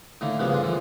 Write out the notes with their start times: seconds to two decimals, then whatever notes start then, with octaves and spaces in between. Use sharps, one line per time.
0.21 A2 D3 D#3 A#3
0.39 G2 C#3 F3 A#3 B3
0.52 D3 D4 F4 G#4
0.63 A#2 D3 E3 F3